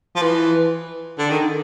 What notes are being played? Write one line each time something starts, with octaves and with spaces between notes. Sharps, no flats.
F3
E3
D3
D#3